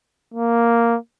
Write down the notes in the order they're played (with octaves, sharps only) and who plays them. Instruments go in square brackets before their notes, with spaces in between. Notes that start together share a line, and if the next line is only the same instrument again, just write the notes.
[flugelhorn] A#3